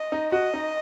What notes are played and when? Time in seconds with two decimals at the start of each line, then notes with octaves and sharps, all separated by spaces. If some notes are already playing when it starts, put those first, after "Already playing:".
Already playing: D#5
0.12 D#4
0.32 F#4 D#5
0.54 D#4